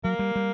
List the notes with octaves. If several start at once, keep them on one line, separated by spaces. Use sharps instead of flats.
F#3 A#3
G3
G3